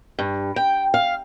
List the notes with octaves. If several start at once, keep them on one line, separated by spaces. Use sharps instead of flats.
G2
G5
F5